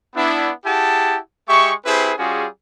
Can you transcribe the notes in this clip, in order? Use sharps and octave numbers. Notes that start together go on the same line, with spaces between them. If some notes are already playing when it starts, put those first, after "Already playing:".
B3 D4 E4
E4 G4 G#4 F#5 A5
G#3 G4 E5 C#6
C4 E4 G4 G#4 B4 C5
G3 C#4 F4 F#4 G#4